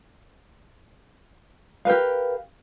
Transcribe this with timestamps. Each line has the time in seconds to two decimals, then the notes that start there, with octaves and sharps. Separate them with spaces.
1.85 G4 A#4 B4 F5